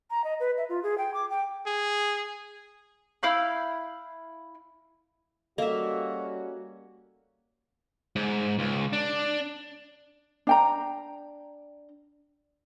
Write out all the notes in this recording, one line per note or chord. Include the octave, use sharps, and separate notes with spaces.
A#5
D#5
B4
E5
F4
G#4
G5
D6
G5
G#4
E4 F5 B5 G6
G3 A#3 C#4 F#4 A4 D#5 E5
G#2
C#2
D4
D4 G5 A#5